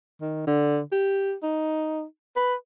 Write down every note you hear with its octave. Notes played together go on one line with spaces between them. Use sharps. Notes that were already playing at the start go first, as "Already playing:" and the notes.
D#3
D3
G4
D#4
B4